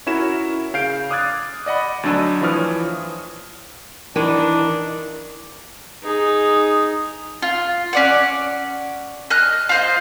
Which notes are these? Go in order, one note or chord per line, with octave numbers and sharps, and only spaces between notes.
C#4 E4 F#4 A#4 C#5 E7
C#3 F5 G6 C7 D7
D6 D#6 F6 F#6 G#6 A6
D5 D#5 F#5 B5
D2 F#3 D4 E6 D#7
E3 F3 C#5 D#6 F6
D#3 E3 D4
D#4 G#4
F4
C#4 D5 F#5
D#5 F6 F#6
F4 C5 D#5